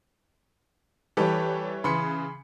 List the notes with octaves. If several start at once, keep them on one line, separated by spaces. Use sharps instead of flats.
E3 G3 G4 A4 B4 C#5
C#3 E3 B5 C6 C#7